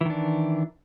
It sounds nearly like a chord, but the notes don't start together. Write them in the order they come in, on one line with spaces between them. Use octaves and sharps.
E3 D#3 D4